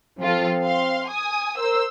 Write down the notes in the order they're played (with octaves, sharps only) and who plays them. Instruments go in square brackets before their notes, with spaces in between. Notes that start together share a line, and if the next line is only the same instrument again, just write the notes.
[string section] F3 F4 A4 [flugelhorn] C4
[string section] F5 C6
G#5 D#6
[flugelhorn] A#4 [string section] C5 E6